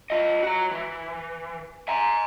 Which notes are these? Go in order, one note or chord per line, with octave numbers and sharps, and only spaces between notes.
F4 D#5
F#4 A#5
E3
G#5 A#5